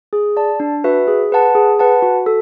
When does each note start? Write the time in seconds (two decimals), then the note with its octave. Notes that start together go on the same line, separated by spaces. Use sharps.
0.13 G#4
0.37 D5 A5
0.60 D4
0.84 F#4 B4 E5
1.07 G#4
1.32 B4 F#5 A5
1.55 G#4
1.79 B4 F#5 A5
2.02 F#4
2.26 A4